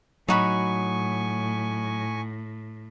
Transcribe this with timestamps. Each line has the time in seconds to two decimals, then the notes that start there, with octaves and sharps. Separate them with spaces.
0.28 A2 F#3 D#4 F#4 G#5 B5 C#6